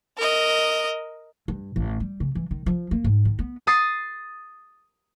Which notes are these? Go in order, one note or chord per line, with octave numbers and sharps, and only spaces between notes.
A#4 D#5
G2
A1
G3
C#3
E3
D#3
F3
A#3
G#2
D#3
B3
D#6 A6 C7